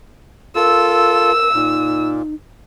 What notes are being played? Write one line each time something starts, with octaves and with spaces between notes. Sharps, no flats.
F4 A4 A#4 E6
A#2 D#4